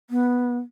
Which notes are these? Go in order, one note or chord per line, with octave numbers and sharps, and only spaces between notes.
B3